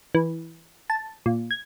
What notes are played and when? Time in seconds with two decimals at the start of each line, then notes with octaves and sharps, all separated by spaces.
0.15 E3
0.90 A5
1.26 A#2
1.51 G#6